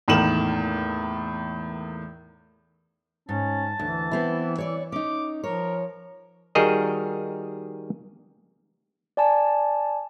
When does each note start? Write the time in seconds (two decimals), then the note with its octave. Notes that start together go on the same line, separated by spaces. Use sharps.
0.08 E2 A2 D#3 A#3 E7 F#7
3.29 G#2 C#4 A5
3.79 D2 E3
4.11 B3 C4 E4
4.58 C#5 D5
4.92 C#4 D#4 D6
5.44 F3 A#4 C#5
6.55 D#3 G3 F#4 G#4 A#4 D#5
9.17 D5 G#5 A5